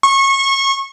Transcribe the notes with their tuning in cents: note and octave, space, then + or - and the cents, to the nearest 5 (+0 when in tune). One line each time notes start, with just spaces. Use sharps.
C#6 -25